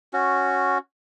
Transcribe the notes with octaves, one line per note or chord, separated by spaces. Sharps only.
C#4 F#4